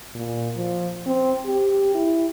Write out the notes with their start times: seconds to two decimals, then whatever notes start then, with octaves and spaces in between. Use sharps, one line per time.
0.15 A#2
0.56 F3
1.06 C4
1.45 G4
1.94 E4